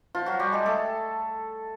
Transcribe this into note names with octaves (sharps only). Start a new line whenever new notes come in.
F3 F4
F#3 F#4
G3 G4
G#3 G#4
A3 A4